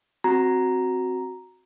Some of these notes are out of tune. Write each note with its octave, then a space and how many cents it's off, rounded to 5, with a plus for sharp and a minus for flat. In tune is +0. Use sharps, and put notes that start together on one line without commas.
C4 +0 F#4 +0 A#5 +0